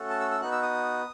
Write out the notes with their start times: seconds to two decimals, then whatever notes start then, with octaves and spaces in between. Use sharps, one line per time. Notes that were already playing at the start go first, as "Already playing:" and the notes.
Already playing: A3 C#4 F#4 A4
0.10 A5
0.20 E6
0.31 E6
0.41 B3 D#4 F#4 F#6
0.52 E6
0.63 D#6